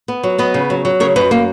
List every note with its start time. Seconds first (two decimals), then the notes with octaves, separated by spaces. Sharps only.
0.08 B3
0.24 F#3
0.39 B3 B4 D#5
0.54 C#3
0.70 F#3
0.85 F#3
1.00 C#3 A#4 C#5
1.16 F#2 B4 D#5
1.31 A#3